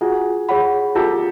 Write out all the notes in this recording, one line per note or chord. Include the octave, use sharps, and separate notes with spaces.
F4 F#4 G#4
G#4 C#5 F#5 B5
F4 G4 A4